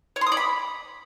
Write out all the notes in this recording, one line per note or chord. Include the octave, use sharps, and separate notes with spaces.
C#5
C6
D#6
D5
B5